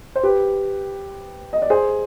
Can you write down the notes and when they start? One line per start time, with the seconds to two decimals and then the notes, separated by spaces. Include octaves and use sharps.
0.15 C5
0.23 G4 B4
1.53 D#5
1.62 D5
1.70 G#4 C5